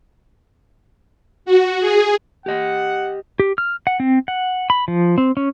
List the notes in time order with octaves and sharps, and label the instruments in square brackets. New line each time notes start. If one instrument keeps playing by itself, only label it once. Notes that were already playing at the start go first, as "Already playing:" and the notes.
[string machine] F#4
G#4
[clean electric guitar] G4 D#5 [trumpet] F#5
[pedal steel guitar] G4
F6
F#5
C4
F#5
B5
F3
C4
C#4